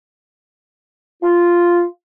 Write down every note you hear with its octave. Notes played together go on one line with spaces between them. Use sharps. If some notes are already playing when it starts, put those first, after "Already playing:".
F4